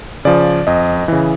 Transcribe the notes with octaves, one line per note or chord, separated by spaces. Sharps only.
C#3 F3 D5
F2 D#5
C#3 E3